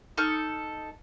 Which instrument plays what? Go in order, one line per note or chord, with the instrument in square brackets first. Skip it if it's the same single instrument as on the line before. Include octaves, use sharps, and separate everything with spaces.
[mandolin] D#4 A4 C#6 F6